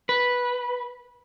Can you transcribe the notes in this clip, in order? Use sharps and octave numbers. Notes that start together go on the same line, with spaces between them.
B4